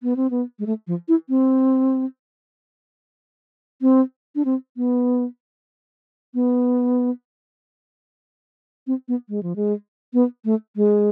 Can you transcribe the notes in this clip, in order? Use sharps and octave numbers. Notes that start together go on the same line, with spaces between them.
B3
C4
B3
G#3
A3
F3
E4
C4
C4
D4
C4
B3
B3
C4
B3
G#3
F3
G#3
B3
A3
G#3